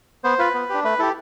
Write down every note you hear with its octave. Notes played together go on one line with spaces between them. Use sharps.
B3 C5
F4 B4
B3
D4 G4
A3 B4
E4 G4 A4